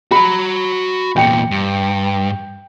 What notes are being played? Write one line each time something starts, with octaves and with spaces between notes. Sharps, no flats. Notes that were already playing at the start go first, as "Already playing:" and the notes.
F#4 A#5 B5
E2 A#2 G5 C#7
G2